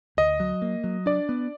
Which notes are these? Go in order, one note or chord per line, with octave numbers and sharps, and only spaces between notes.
D2 D#5
F#3
A#3
F#3
D4 D5
B3